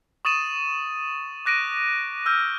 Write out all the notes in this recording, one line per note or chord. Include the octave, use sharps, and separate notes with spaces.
C#6 D#6 A6 D#7 E7
D6 F#6 A#6 D7 D#7
E6 F6 G6